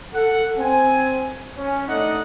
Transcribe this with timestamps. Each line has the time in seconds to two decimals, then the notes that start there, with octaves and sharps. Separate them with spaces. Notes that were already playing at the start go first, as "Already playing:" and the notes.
0.14 A4 F#5
0.58 C4 G#5
1.57 C#4
1.87 A3 D4 D#4 D5 D#5 F#5